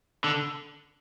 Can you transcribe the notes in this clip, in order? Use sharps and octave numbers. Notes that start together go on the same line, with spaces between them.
D3